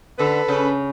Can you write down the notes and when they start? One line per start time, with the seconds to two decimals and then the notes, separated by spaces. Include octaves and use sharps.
0.19 D3 A4 B4
0.48 C#3